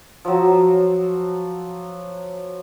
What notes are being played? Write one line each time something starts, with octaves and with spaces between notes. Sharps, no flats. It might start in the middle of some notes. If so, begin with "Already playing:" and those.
F3 F#3